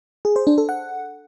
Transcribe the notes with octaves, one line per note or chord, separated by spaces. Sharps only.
G#4
C5
D4
A4
F#5